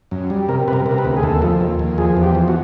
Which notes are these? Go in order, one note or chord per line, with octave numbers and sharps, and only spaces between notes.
F#2
G3
C3 A#4
C3 B4
A#4
C3
A#4
B4
D2
G#4
D#2 A4
F3
D#2
D#2
F3 G#4
E2
G4
F3
F#4